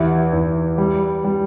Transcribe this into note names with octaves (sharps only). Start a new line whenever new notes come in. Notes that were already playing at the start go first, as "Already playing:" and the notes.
Already playing: E2 E4 G4
E2
G3
G3